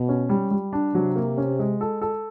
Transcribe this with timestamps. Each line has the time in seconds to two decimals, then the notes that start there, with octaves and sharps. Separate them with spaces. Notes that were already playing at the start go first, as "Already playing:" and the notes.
Already playing: B2
0.09 C#4
0.29 G3
0.51 G3
0.73 D4
0.94 C3 F#3
1.16 A#3
1.37 C#4
1.59 G#3
1.81 A4
2.01 A4